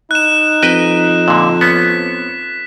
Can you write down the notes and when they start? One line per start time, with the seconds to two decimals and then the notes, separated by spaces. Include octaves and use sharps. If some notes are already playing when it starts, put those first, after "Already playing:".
0.11 D#4 F#6 E7
0.63 F2 B4 D#5 G5 F#6
1.28 A#2 D3
1.61 B3 C#4 B6